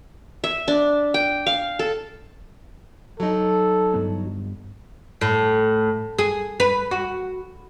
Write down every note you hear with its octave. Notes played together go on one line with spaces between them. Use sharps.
E5
D4
G5
F5
A4
F#3 D#4 A4
G2 B3
A2
G#4
B4
F#4